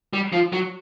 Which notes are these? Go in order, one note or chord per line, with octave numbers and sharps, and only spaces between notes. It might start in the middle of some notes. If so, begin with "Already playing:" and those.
G3
F3
F#3